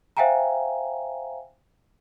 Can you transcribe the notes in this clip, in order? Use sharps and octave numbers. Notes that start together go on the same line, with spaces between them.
C5 E5 F5 G5 G#5 A#5